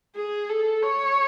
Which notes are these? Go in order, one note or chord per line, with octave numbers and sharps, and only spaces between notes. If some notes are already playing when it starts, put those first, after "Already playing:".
G#4
A4
C#5